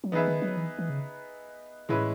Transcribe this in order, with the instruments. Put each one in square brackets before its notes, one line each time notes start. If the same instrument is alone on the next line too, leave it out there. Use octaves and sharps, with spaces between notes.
[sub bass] F#3
[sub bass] E3 [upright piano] B3 D#4 G#4 B4 E5
[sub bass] D#3
F#3
E3
E3
C#3
[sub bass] A2 [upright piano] E3 G#3 C#4 E4 B4